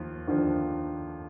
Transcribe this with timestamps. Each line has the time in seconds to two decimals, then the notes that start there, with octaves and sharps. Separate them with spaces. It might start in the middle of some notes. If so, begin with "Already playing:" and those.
Already playing: D#2 F3
0.27 D#2 D3 F3